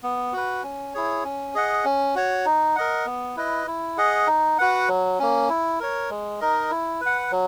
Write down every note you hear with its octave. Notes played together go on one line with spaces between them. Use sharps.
B3
F#4 B4
C#4
E4 G#4 C#5
C#4
G#4 D#5 F#5
C#4
F#4 C#5
D#4
A#4 D#5 F#5
B3
E4 B4 D#5
E4
G#4 D#5 F#5
D#4
F#4 B4 F#5
F#3
A#3 C#4
E4
A#4 C#5
G#3
D#4 A#4 D#5
E4
B4
F#5
F#3